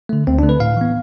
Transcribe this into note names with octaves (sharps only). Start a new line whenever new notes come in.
D3 A3
D2 C4
D3 A3 D4
B4
A2 F5
E3 B3